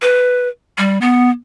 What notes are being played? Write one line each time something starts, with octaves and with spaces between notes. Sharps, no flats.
B4
G3
B3